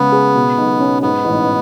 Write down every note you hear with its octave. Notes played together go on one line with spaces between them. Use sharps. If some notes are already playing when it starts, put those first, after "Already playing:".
Already playing: C#3 G#3 B3
G#4
B2
B1
C#4
G#2 B3
A1